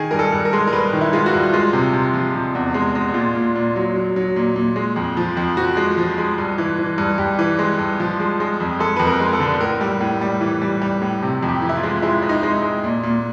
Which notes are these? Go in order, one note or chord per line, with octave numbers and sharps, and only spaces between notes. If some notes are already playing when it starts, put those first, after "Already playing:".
Already playing: D#3 G#4
G2 A#4
A4
G2
A#4
G#3
A#4
G2 B4
D#3
E4
G#3 F4
F#4
G2
G#3 F4
C3
C3
F3
C3
E2
G#3
G#3
A#2 F4
A#2
A#2
F#3
F#3
F#3
A#2
A#2
G#3
F2
F3
F2
F3 F#4
G#3
F3
G#3
G2
E3
E3
G2
G2 G4
E3
G#3
G2
F3
G#3
G#3
F2
G#3 A4
F2 B4
A#4
G#3
A4
D3
A2 A#4
G3
A2
G3
E3
G3
G3
A2
C3
F2
G4
E3
E4
F4
G#3
G#3 E4
G#3
D#4
G#3
G#3
A#2
A#2